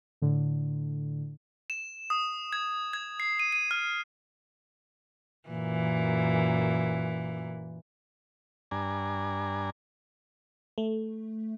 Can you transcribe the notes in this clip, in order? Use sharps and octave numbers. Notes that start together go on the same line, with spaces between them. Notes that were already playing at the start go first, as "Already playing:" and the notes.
A2 D3
E7
D#6
G#6
G#6
C7
D#7
D#7
F6
F#2 A#2 E3
G2 D4 G#5 A#5
A3